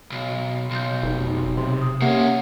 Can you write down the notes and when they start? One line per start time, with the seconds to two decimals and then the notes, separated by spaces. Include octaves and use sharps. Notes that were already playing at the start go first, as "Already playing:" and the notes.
0.12 B1
0.71 B1 C6 G6
1.03 F1 D#4
1.57 C3 C6
1.82 D#6
2.02 C3 A#3 C#4 G4 E5 F#5